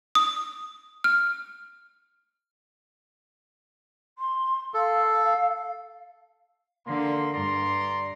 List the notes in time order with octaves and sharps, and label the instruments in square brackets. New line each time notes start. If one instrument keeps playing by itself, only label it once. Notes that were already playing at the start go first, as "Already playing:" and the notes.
[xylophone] D#6
F6
[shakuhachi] C6
[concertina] A4 [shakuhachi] F5
[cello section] D3 [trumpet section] A#3 C6
[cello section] G2 [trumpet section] D5 A#5 C6